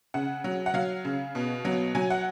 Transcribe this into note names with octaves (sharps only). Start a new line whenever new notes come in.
C#3 F#5
F#3
F#5
F#3 F5
C#3
B2
F#3
F#3 G#5
F#5